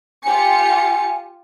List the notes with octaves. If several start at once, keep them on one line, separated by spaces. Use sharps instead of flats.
F4 G4 G#5 C#7